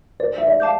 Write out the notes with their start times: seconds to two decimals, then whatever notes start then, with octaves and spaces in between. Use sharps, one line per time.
0.20 C5 D5
0.38 E5
0.47 D5
0.60 F5 A5 D6 G6